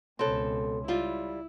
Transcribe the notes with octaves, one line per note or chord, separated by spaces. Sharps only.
C#2 B2 C4 A4 C#5 B5 C6
G3 E4 F4